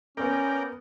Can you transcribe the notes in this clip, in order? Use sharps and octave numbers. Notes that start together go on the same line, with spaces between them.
A#3 B3 C#4 A#4 D5 G5